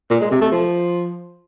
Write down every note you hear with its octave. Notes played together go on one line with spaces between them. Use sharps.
A#2
G#3
C3
A3
F3